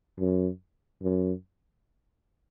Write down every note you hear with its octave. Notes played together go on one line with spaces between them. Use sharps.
F#2
F#2